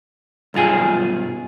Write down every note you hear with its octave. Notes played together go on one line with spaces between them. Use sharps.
B1 G2 F4 G#4